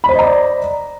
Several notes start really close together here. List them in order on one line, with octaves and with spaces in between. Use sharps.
B5 C5 D#5 A#5 D5